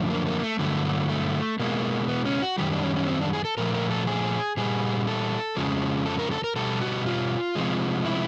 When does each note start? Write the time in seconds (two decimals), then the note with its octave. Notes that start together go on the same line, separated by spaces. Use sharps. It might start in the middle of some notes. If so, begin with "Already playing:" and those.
Already playing: F#2 D3 F3 A3
0.10 A#3
0.27 A#3
0.43 A3
0.59 G2 D3 F#3 A3
1.09 A3
1.59 B2 G#3 A#3
2.08 B3
2.25 C#4
2.42 F#4
2.58 F#2 D#3 G3 G4
2.71 D4
2.83 C#4
2.96 C#4
3.07 C4
3.21 D4
3.33 G#4
3.45 A4
3.58 A#2 F3 A3 A#4
3.74 A#4
3.90 A4
4.07 G#4
4.57 A#2 G3 G#4
5.07 A4
5.57 F2 C#3 F3 G#3
6.06 A4
6.19 A#4
6.31 A4
6.44 A#4
6.56 B2 G3 A4
6.82 F#4
7.06 F4
7.55 C3 F3 G#3
8.05 E4